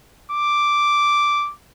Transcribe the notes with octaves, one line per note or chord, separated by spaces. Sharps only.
D6